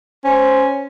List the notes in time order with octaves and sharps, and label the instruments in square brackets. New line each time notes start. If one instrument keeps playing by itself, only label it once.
[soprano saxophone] C#4 [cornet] C5